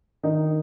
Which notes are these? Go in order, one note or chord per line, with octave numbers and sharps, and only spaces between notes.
D#3 D#4